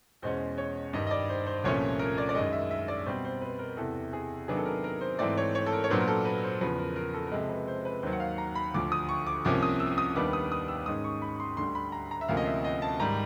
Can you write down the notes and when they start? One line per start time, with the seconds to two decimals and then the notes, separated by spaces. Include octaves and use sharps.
0.22 E2 B2 G#3 C#4 C5
0.58 C#5
0.93 G2 D#3 G3 D#5
1.07 D#5
1.11 D5
1.29 C5
1.46 C5
1.64 C2 A#2 F3 A3 C#4 C#5
1.99 A#4
2.18 D5
2.29 D5
2.35 F#2 D#3 G#3 D#5
2.53 E5
2.71 E5
2.88 D5
3.06 B2 G3 C4 C5
3.25 C5
3.41 B4
3.59 A#4
3.77 E2 C3 E3 A4
4.13 G#4
4.48 C3 D#3 F#3 B3 D4 G#4
4.57 A4
4.65 A#4
4.84 A#4
5.01 C5
5.19 G#2 E3 A3 C4 D5
5.38 C#5
5.55 C#5
5.66 A4
5.72 A#4
5.84 C#5
5.90 A#2 F#3 B3 D4 C5
6.01 A#4
6.08 A4
6.25 B4
6.44 C5
6.60 E2 C#3 F3 B4
6.78 A#4
6.96 A#4
7.14 A4
7.27 A#4
7.32 C3 F3 G#3 A4
7.49 B4
7.68 C5
7.85 B4
8.03 D#2 D#3 F#3 C5
8.13 F#5
8.20 F5
8.38 A#5
8.55 B5
8.74 D2 D3 F3 D6
8.92 D#6
9.09 C#6
9.27 D6
9.45 C2 C3 F3 A#3 C#4 D6
9.63 D#6
9.80 E6
9.98 D#6
10.15 D#2 D#3 G3 B3 D4 D6
10.33 D#6
10.52 D#6
10.68 E6
10.86 G#2 D#3 G#3 C#4 D#6
11.04 C#6
11.22 B5
11.40 C6
11.57 D2 D3 G3 C6
11.75 B5
11.92 A#5
12.11 A#5
12.21 E5
12.28 D2 C3 F3 A#3 C#4 F5
12.37 D#5
12.46 E5
12.64 D#5
12.82 A5
13.00 G#2 D#3 G3 A#5